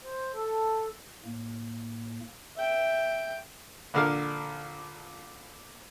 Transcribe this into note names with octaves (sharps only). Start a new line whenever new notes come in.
C5
A4
A2 A#3
E5 G5
A#1 D3 A#4 F5